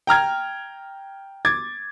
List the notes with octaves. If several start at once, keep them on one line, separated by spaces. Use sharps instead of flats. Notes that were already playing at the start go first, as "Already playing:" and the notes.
G5 A#5 F6 G#6
D6 G#6 A6